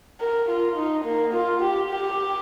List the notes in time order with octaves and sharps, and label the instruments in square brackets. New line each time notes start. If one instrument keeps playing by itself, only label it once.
[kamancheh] A#4
F4
D#4
A#3
F4
G4
G4